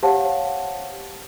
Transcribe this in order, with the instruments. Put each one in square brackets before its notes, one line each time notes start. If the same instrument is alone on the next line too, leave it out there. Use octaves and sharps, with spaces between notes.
[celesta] G4 C5 C#5 F5 F#5 A5